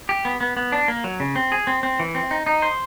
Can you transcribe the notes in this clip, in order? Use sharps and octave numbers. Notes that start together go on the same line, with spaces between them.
G4
B3
B3
B3
D4
A#3
F#3
C#3
C4
G#4
C4
C4
E3
C4
D#4
D#4
C5